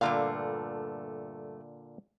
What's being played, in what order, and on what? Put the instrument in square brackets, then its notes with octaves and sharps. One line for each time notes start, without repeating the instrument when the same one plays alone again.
[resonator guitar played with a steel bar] G2 A3 F5 [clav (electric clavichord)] A#2 D3